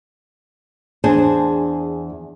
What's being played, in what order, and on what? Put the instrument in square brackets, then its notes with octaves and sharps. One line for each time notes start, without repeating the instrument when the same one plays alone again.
[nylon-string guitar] E2 D4 G#4 C5